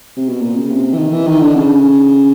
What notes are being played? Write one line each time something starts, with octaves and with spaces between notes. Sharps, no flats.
C3
B2
A#2
C#3
C3
E3
D#3
E3
D#3
D3
C#3